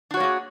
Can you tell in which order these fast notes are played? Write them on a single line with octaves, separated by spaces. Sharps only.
D4 F#4 C#5 A#3 G#4